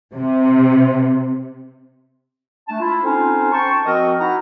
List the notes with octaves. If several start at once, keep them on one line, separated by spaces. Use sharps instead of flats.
C3
A3 D4 A5
E4 F4
C4 C#4 D#4 F4 A4 C5
G5 A5 C6 C#6
F3 C4 F#4 A#4 D#5
D#4 E4 F#4 F#5 A#5